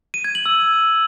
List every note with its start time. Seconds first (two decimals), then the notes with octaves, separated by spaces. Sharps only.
0.14 D#7
0.24 G#6
0.35 F#7
0.46 E6